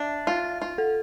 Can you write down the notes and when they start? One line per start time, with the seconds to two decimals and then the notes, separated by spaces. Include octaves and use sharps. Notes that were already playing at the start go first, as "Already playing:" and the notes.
Already playing: D4 E5
0.27 F4
0.62 F4
0.78 A4